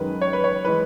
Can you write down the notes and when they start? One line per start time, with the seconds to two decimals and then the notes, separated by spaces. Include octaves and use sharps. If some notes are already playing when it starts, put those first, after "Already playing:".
Already playing: F#2 D#3 G#3 B4
0.22 C#5
0.33 B4
0.44 C#5
0.65 E3 G#3 B4